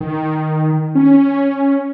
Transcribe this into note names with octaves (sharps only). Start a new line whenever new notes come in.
D#3
C#4